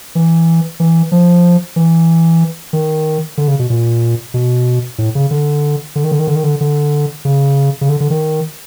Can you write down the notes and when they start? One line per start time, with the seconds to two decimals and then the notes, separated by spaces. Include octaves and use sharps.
0.15 E3
0.80 E3
1.12 F3
1.76 E3
2.73 D#3
3.38 D3
3.48 C#3
3.59 B2
3.70 A#2
4.34 B2
4.98 A2
5.15 C#3
5.31 D3
5.95 D3
6.04 D#3
6.11 D3
6.19 D#3
6.27 D3
6.35 D#3
6.43 D3
6.61 D3
7.25 C#3
7.81 C#3
7.89 D3
8.00 D3
8.10 D#3